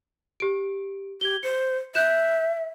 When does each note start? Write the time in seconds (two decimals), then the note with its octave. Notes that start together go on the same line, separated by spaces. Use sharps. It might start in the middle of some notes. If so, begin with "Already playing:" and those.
0.40 G4 D7
1.21 G4 G#6 G7
1.43 C5 C#7
1.95 E5 F#6 G6 E7